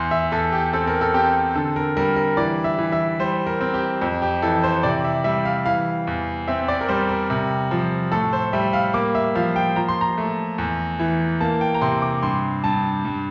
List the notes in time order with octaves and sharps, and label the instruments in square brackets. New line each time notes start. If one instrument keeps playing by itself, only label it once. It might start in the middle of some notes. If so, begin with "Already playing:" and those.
Already playing: [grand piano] E2 C6
E5
E2 A4
G4
C4 A4
A#4
A4
C4 G4
D3 A4
A#4
G3 A#4
A#4
E3 D5
E5
E3
E5
G3 C5
A#4
C4
G4
F2
G4
E3 A4
C5
C3 D5
E5
G3 E5
F5
E3 F5
E2
C4 E5
D5
A#4
G3 C5
A#4
C3
F3
A2 A4
C5
G3 E5
F5
A#3 D6
E5
F3 F5
G5
F3 A#5
C6
A#5
A3
E2
E3
A#3 A5
G5
A#5
C3 C6
D6
G2 C6
G2 A5
G2